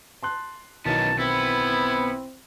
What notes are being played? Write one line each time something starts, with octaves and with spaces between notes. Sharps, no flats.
A5 C6 F#6
B1 D#3 E3 B3 C#4 D#4 A5
B3 C4 E4